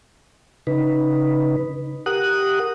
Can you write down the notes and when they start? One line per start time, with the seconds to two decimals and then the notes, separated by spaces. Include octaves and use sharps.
0.67 C#3 D#4 B4
2.06 G4 A#4 F#5 D#6 F#6